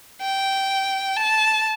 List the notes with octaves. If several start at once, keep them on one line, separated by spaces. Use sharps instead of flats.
G5
A5